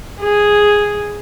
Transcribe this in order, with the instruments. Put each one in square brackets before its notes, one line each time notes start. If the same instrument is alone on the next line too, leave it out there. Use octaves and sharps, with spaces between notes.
[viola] G#4